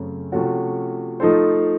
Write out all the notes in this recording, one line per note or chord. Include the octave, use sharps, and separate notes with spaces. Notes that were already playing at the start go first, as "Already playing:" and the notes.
Already playing: F#2 C#3 A3 C4
C3 F3 A3 C#4 F#4
F3 A3 D#4 A4 C5